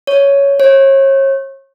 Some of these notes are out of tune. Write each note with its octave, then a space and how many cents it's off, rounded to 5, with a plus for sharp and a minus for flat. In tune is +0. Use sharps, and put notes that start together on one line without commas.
C#5 +10
C#5 -35